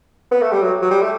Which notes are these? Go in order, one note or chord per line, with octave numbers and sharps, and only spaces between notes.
B3
A3
G3
F#3
F#3
G3
A3